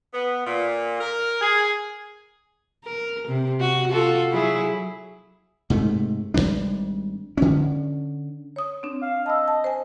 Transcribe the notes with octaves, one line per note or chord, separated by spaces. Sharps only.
B3
A#2
A#4
G#4
A#4
C3
F#4
F4 F#4 A4
F#3 E4 G#4
G#2 C3 A3
G#1 F#2 G3 D4
D3 C#4
C#5 D#6
C4 D4
F5
D#5 A5 B5 E6
A5
C5 G#5